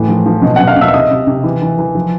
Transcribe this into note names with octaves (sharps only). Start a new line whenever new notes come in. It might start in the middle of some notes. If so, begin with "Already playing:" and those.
Already playing: A2 E3
F3
F3
B2
B2 F#5 F#6
F5 F6
B2 E5 E6
E6
C3 D#5 D#6
C3
C3
E3
E3
E3
F3